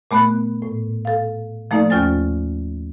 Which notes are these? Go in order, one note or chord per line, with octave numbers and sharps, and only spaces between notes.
A#2 A3 B3 B5 F#6
A2
A4 F5
F3 A3 A#3 D#4 A4 D5
D#2 C#4 F4 C5 G#5 A6